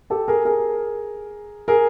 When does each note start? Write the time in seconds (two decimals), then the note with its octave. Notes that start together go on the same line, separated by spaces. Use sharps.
0.10 G4 A4
0.28 G#4 A#4
0.45 G#4 A#4
1.68 G#4 A#4